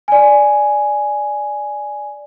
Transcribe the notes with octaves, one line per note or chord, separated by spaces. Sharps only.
D5 G#5